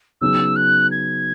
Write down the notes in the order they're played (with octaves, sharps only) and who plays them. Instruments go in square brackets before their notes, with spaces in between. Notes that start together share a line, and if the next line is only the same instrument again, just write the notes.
[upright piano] C#3 F#3 B3 D#4 G#4 [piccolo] E6
[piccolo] F#6
G#6